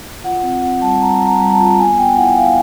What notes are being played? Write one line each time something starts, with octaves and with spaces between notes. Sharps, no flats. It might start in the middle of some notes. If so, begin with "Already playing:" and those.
F4 F#5
C4
C4 F#5
G3 A5
G3 A#5
G3
A#5
G3
A5
F4
B3 G#5
B3 G5
E4 F#5
E4 F5